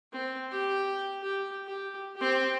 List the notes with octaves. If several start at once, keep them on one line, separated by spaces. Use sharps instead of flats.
C4
G4
G4
G4
C4 G4